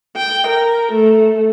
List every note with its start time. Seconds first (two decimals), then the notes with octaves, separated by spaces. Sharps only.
0.16 G5
0.47 A#4
0.92 A3